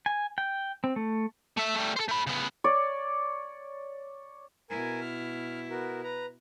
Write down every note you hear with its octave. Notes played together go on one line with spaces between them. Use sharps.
G#5
G5
C4
A3
A3 E5
G3 A3
A4 C5
A3 B5
C#3 B3
C#5 D5
B2 E4 A#4 G#5
F6
B3 F#4 A#4
B4 A#5